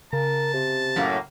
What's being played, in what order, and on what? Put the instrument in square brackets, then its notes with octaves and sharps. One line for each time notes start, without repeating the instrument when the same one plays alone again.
[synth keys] C#3 [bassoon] A#4 [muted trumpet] A5
[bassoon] C3
[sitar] F#2 A2 A#3